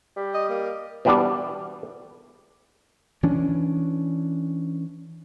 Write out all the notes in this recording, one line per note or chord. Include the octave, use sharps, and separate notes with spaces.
G3
D#5
A#3
B2 E3 G3 B3 D4 G4
E3 C#4 D4